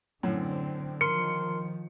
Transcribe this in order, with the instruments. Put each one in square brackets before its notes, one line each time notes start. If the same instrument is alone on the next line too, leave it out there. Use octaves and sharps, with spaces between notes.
[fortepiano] F#2 A2 [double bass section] D3 C4
[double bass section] D#3 F3 [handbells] A#4 C6 [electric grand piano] C#7